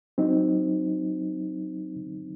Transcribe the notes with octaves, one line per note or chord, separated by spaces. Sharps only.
F#3 C4 D#4